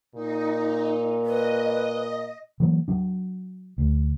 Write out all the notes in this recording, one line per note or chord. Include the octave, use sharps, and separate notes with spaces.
A#2 D#4
B4 D#5
E3 F#3 A#3
F#3 D4
D2